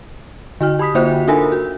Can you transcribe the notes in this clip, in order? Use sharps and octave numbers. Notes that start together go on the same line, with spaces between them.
D3 F#4 F6
G4 B5 D#6 B6
D3 A#3 F4 F#4 C5 E5
D4 D#4 F4 A4 A#4 G#5
F#4